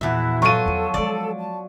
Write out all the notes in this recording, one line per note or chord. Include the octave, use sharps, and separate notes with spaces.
E2 A#2 F3 E4 F#4 E5
F#3 F4 A4 C#6 D#7
E2 F3
F3 G#3 D5
A5